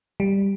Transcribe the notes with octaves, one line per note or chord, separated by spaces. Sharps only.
G3